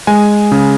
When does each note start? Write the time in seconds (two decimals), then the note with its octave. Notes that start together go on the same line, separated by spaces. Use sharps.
0.07 G#3 G#5
0.52 C#3